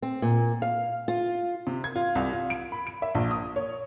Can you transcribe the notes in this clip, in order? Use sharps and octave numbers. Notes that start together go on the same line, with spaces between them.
C4
A#2
F5
F4
C3
G#6
F4
C2
F4
D7
B5
D7
E5
A#1
D#6
C#5